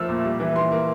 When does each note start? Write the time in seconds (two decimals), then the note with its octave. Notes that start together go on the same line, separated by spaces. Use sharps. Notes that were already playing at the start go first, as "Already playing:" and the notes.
Already playing: F3 A3 A#3 C4 E6 F6
0.09 A#2
0.24 G3
0.40 E3
0.56 E3 C6
0.72 A#3